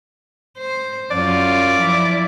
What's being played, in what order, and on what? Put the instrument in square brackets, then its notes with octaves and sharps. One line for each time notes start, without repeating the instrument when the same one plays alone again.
[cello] C5
[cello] F#2 F4 [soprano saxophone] D5
[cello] F3 E4